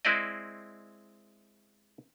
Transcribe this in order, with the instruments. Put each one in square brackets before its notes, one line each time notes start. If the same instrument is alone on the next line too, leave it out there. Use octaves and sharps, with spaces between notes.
[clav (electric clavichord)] G#3 C4 E4 C5 D5 D#5